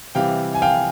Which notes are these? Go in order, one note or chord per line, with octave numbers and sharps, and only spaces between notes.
C3 E3 G3 F5 G5
G#5
F5 G5